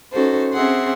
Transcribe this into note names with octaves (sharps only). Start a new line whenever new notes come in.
C#4 D#4 F#4 A4 C5
C4 C#4 G#4 E5 F#5 C6